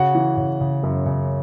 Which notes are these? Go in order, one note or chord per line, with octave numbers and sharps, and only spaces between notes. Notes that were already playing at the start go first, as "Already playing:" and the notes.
Already playing: C#3 F#4 F#5
E3
C#3
C#3
F#2
C#3